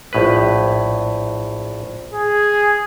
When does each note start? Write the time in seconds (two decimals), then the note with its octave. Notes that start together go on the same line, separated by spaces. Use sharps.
0.13 A#1 A2 B4
2.14 G#4